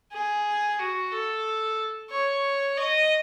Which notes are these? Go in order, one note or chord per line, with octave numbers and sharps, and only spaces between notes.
G#4
F#4
A4
C#5
D#5